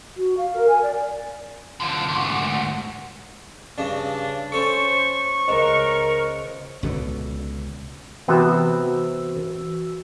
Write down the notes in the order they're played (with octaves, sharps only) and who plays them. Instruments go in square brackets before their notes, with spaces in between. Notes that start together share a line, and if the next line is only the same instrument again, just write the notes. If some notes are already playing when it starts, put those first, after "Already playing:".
[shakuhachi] F#4
F5
A#4
G#5
D5
[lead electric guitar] D3 F3
D2 G#2
[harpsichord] G2 C#3 [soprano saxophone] D4
[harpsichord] C#4 A4 [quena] C5 [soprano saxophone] C#6
[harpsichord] C#2 [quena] A#4 [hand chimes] C5 D#5
[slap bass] C#2 B2 D3
[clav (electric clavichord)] C3 B3 C4 [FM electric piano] E3 F#4 E6